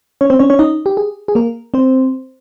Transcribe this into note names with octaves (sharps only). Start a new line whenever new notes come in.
C#4 C#5
C4 C5
C#4 C#5
C#4 C#5
D#4 D#5
G4
G#4
G#4
A#3 A#4
C4 C5